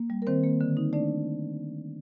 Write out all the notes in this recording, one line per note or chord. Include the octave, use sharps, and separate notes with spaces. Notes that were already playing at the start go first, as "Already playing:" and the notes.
Already playing: A#3
G3
A#4
D#3 C4 C5
A#3
D3
D#4
A3 D4 D5